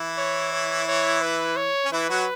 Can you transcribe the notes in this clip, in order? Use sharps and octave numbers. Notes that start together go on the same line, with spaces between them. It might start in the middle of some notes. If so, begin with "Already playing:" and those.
Already playing: E3 E4
C#5
C#5
C#5
B4
C#5
C#4
E3 E4 B4
F#3 F#4